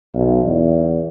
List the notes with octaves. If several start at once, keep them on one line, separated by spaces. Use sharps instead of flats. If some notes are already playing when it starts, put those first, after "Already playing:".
B1
E2